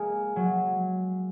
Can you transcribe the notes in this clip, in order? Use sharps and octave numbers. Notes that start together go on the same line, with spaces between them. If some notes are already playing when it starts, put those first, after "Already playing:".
Already playing: G#3 A#3
F#3